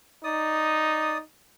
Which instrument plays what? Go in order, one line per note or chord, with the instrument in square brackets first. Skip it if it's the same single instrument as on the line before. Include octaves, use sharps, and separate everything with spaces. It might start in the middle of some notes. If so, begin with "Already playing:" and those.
[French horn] D#4 [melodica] D5 D#6